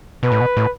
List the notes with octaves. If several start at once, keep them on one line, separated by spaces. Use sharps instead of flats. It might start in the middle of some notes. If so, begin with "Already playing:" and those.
B2 B4
A2
B2
A2